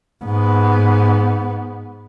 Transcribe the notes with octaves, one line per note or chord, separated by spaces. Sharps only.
G#2 B3